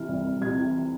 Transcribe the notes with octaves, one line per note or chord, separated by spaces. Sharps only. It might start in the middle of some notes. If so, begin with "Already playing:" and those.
Already playing: C3 E3 F6
C2
C2
C3 G#6
E3